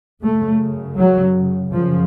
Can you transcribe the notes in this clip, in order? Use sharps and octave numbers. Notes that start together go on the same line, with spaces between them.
F#2 C#3 A3
F#3
F#2 C#3 F3